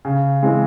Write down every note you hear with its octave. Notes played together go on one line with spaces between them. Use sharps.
C#3
E3 G#3 C4